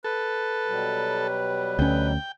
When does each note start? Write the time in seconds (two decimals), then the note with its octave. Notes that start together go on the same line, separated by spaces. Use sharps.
0.04 A4 B4
0.66 B2 F#3 G3
1.79 D2 C#4 G5